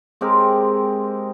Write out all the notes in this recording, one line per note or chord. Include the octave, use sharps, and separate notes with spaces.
G#3 C4 G4 A#4